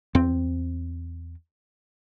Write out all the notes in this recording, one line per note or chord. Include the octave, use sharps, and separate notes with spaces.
E2 C4